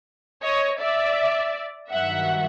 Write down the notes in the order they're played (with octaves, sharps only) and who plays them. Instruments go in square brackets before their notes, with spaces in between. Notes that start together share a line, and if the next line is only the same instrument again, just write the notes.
[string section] C#5 D#5
D5 E5
G2 D#3 F#3 E5 F#5